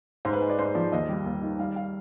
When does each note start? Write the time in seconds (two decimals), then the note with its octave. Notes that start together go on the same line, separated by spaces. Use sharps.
0.25 G#2 C5
0.33 B4
0.41 G#3
0.50 D5
0.59 G#2 C5
0.75 F3 D5
0.92 D#2 D#5
1.09 G3
1.26 D#2
1.43 D#3
1.59 G3 F5
1.76 F5